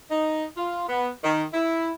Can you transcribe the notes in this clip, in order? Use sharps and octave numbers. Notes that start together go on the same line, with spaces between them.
D#4
F4
B3
D#3
E4